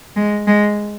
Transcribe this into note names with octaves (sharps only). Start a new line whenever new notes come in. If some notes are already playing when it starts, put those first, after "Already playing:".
G#3
G#3